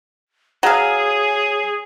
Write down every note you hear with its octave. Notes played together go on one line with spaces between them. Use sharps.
F#3 G#4 F5